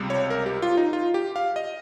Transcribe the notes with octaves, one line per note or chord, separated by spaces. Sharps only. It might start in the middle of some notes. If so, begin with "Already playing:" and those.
Already playing: C#2 C3 G3
C#5
A#4
G4
F4
D#4
F4
G4
F5
D#5